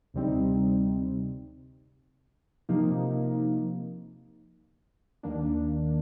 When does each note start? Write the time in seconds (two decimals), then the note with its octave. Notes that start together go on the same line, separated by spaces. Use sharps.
0.14 D2 C3 G3 C4 D#4
2.69 C3 F3 A#3 D#4
5.23 D#2 D#3 A#3 D4